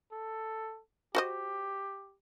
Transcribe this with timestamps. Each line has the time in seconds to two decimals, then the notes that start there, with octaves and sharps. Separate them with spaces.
0.13 A4
1.15 F#4 G4 C5 D#5